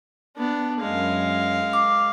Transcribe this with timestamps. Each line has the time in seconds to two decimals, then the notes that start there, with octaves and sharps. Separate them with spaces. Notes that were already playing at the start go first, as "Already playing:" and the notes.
0.37 B3 D4
0.81 F#2 G#3 F5
1.73 D6